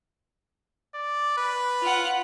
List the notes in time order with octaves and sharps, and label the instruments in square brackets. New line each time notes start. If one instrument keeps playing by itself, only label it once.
[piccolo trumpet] D5
B4
[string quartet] F4 F#5